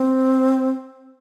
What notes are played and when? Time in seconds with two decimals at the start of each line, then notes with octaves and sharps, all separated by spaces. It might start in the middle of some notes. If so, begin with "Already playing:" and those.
Already playing: C4